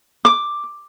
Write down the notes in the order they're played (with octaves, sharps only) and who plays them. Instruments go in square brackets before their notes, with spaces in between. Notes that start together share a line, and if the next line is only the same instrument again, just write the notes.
[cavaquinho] D6